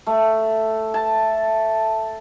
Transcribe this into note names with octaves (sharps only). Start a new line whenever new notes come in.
A3
A5